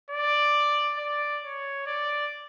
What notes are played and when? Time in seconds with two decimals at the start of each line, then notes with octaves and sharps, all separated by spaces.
0.10 D5
0.98 D5
1.43 C#5
1.86 D5